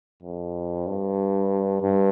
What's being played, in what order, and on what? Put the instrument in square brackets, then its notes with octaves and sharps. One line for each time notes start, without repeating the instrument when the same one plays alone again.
[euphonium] F2
G2
G2